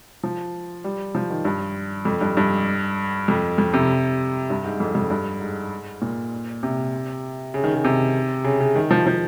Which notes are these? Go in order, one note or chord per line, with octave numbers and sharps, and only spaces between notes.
F3
G3
F3
D#3
G2
F2
G2
G2
F2
F2
C3
G2
G#2
F2
F2
G2
G#2
A#2
C3
C#3
D#3
C#3
C3
C#3
C#3
D#3
F3
F3